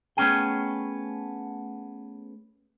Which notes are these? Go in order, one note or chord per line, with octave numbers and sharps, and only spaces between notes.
A3 B3 C#4 G#4 G5